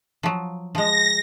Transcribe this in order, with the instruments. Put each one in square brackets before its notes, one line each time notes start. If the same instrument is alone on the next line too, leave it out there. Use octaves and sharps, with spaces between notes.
[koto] F3 F#3
[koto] F3 G#3 [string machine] A#6